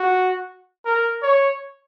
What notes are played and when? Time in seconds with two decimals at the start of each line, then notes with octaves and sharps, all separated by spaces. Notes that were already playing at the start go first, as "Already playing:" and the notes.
Already playing: F#4
0.85 A#4
1.23 C#5